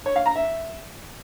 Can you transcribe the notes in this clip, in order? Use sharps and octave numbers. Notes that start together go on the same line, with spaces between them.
C#5
F5
A#5
E5